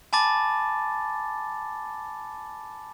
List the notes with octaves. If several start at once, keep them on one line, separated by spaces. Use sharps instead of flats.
G#5 A5 B5 D6 A6